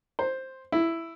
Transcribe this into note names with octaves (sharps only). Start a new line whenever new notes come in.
C5
E4